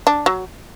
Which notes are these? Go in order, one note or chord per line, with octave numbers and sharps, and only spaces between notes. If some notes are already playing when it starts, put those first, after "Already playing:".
D4
F#3